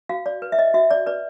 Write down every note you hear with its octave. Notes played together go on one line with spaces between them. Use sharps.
F#4 F5
D5
B4
E5
D#5
F#4 E5
D5
B4 D5